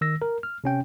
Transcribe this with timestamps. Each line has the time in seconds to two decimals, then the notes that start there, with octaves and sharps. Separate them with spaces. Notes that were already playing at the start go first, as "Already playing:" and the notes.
0.01 D#3 E6 A#6
0.22 A#4
0.43 F6
0.64 C3 C#4 G5